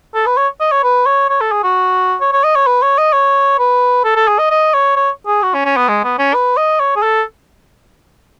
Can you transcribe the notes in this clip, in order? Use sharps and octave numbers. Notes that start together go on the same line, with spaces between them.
A4
B4
C#5
D#5
C#5
B4
C#5
C#5
A4
G#4
F#4
C#5
C#5
D#5
C#5
B4
C#5
D#5
C#5
B4
A4
A4
G#4
D#5
D#5
C#5
C#5
G#4
F#4
C#4
C#4
B3
G#3
B3
C#4
B4
D#5
C#5
G#4
A4